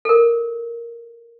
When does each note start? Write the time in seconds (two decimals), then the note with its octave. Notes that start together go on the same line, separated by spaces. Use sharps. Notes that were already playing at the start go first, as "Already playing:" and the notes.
0.05 A4 A#4